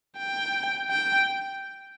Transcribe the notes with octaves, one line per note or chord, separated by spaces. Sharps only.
G5
G5